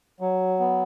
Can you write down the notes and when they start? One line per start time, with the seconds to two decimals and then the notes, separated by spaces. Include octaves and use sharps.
0.20 F#3
0.60 B3